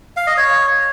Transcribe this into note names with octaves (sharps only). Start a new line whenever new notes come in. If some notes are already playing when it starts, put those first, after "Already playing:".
F5
D#5
C#5